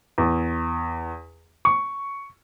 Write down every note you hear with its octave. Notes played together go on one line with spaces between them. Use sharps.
E2
C#6